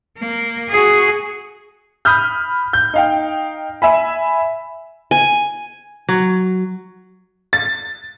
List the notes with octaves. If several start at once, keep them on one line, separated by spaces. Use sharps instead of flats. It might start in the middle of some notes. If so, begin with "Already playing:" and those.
A#3
F#4 G#4
B5 D#6 F6 G6
G6
D#4 F5 G5
E5 G#5 B5
G#5
F#3
A6